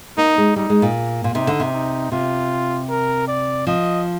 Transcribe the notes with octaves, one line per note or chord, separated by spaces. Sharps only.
A#3 D#4
G#3
G3 D#4
G#3
A#2
A#2
C3 D#4
D3
C3
D#4
C3 F4
A#4
D5
F3 D#5